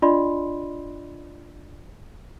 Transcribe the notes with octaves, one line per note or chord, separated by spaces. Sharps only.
D4 F4 D5 D#5 B5 C6